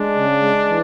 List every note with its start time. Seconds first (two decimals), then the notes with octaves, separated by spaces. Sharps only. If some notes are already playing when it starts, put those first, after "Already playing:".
Already playing: G#3 D4
0.15 C#3
0.42 G#3
0.68 E3